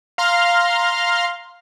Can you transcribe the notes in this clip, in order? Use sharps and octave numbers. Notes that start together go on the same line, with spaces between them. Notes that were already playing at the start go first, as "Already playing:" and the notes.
F5 A#5 C6 F6